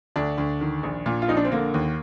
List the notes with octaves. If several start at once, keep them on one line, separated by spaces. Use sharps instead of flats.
D2 D4
D2
D#3
A#1
A#2
F4
A#1 D#4
D4
C4
D3 A#3
D#2